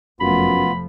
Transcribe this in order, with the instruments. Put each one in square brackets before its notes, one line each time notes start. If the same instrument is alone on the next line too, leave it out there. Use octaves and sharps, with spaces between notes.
[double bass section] F1 F3 A3 [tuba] F#2 [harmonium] B3 F4 [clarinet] B5